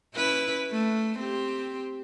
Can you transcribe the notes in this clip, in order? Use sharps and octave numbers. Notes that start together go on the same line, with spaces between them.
C#4 E4 B4
A3
C4 G4